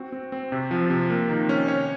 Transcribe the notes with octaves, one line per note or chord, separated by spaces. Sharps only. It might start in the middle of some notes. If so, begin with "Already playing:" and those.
Already playing: C4 F#4
C4
C4
C3
F3
C3
A#3
D#3
C#4
C#5